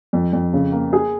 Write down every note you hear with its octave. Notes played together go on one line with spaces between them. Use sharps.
F2
F2
C#3
A#3
G#4